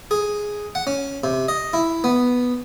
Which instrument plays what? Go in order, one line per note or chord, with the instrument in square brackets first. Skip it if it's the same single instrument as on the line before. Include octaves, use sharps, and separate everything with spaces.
[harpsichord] G#4
F#5
C#4
C3
D#5
E4
B3